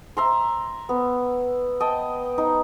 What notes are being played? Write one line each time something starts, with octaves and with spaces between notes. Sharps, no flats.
E5 A#5 C6
B3
D#5 G5 A5
D#4